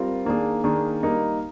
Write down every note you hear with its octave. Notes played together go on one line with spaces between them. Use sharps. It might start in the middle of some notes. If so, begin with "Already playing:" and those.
Already playing: G3 C4 F4 A#4
D#3 A#3 D4 G#4
D#3 A#3 D4 G#4
G3 A#3 D#4 A#4